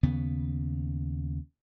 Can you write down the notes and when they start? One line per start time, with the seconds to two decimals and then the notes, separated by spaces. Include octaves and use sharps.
0.03 D#2 C#3 B3